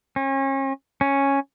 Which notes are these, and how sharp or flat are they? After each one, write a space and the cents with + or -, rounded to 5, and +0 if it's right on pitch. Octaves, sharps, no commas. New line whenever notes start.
C#4 -35
C#4 -5